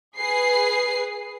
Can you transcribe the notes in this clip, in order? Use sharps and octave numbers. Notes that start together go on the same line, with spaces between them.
G#4 B4 C7